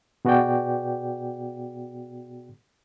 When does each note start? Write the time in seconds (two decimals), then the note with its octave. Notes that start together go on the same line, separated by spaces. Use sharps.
0.25 B2 B3 F#4 G#4 D5 G5